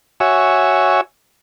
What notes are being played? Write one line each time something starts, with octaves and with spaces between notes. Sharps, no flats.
F#4 C#5 E5 G#5